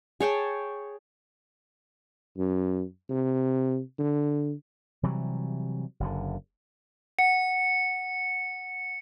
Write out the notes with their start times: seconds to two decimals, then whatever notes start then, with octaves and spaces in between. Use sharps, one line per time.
0.20 G#4 C#5 G5 A5
2.38 F#2
3.09 C3
3.99 D3
5.03 C3 E3 F#3 G3
6.00 F#1 F#2 D3
7.19 F#5 C#7